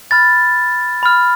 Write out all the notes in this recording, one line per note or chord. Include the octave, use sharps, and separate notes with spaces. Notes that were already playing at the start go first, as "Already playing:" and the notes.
B5 F6 A6
B5 F6